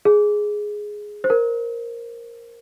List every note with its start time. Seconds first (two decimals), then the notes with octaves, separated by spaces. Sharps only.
0.05 G#4
1.24 C5
1.30 A#4